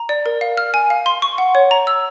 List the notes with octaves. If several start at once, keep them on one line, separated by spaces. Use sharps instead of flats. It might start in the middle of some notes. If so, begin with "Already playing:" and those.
Already playing: A#5
D5
A#4
F5
F6
G#5
F5
C6
C#6
F#5
C#5
A#5
E6